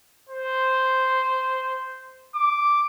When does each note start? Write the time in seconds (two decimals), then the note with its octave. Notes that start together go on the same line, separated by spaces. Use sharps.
0.29 C5
2.35 D6